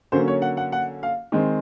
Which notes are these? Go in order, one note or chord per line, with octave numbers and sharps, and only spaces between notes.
D3 F#3 A#3 C#4 C5
C#5
F#5
F#5
F#5
F5
D#3 G#3 C4